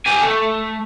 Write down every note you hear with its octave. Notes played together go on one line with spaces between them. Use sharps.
G4 G#5
A3